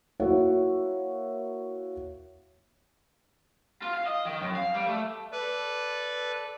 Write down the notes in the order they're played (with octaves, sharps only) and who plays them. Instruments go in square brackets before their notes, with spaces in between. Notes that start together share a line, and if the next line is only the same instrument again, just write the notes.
[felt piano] A#3 E4 F#4 C#5 E5 F#5
[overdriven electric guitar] F4
F5
D#5
D#3
F#2
F5
G3
A3
[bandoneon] A4 D5 [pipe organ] B4